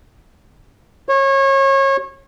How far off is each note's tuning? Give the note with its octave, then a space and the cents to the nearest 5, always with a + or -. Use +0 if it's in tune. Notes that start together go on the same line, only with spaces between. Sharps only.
C#5 -30